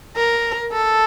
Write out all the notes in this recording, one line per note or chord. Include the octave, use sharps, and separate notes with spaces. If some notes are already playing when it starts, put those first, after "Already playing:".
A#4
A4